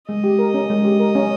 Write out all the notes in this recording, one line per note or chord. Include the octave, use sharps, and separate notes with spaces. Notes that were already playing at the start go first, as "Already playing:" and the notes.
G#3 D#5
G4
A#4
C#4
G#3
G4
A#4
C#4